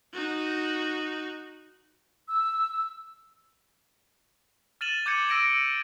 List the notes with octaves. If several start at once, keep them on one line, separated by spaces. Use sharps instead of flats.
D#4 F#4
E6
F6 A6 D#7 E7 F#7
D6 G6 G#6 C#7 D#7
E6 A#6 D7 D#7